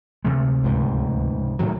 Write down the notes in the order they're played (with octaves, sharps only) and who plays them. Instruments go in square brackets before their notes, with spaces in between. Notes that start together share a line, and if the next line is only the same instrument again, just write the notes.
[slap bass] D2 C3 G#3
[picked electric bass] C#2 G#2
A2 D#3 F#3